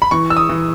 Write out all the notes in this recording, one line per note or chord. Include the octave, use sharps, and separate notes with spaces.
B5
E3 C#6
E6
D#6
E3